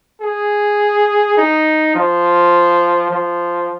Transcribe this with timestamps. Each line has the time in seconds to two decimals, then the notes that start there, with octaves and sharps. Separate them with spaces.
0.22 G#4
1.37 D#4
1.95 F3
3.11 F3